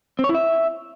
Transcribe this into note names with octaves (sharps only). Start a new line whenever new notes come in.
C4
C#5
E4
E5